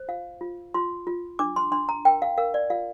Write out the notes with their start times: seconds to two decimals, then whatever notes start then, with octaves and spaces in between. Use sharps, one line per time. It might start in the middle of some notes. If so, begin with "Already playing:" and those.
Already playing: C5
0.08 F4 F5
0.41 F4
0.74 F4 C6
1.07 F4
1.39 D4 D6
1.56 C6
1.72 D4 C6
1.89 A#5
2.05 A#4 G5
2.22 F5
2.38 A#4 F5
2.54 D5
2.70 F4 F5